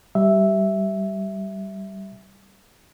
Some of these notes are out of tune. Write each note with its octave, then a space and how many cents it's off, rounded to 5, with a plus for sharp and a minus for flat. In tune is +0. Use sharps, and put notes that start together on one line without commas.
G3 -15 E5 +0